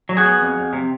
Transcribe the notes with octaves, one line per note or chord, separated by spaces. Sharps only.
F#3
F#4 G#4
B3
F2
F2
C3